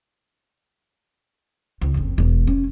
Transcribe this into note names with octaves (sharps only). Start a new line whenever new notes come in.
C#2
F#1 F2
E1
C#4